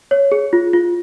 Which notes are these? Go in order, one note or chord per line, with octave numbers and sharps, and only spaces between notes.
C#5
G#4
F4
F4